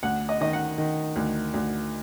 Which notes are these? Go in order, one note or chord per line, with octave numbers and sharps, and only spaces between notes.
D2 F#5
D#5
D#3 D#5
F#5
D#3
D2
D2